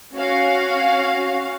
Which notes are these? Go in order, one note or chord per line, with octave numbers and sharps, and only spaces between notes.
C#4 F#4 F5